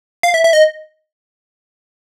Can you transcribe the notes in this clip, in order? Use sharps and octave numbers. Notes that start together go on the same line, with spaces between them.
F5
E5
E5
D#5